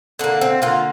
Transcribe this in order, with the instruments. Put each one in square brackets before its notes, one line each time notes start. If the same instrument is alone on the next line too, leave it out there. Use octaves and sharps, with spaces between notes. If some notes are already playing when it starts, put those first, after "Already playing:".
[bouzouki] D3 A#3 D4
C4
D3 A#3 F4